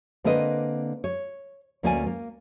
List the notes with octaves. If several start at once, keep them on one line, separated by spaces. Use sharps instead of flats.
D3 A#3 C4 D4 B4 D#5
C#5
D2 A#3 C#4 D5 F#5 G#5
A#3